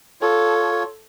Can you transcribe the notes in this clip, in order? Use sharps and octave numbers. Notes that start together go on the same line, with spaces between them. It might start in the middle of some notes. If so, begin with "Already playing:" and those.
F4 A4 C#5